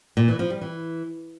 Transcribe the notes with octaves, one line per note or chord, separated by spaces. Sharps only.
A#2
E3
F3
G3
E3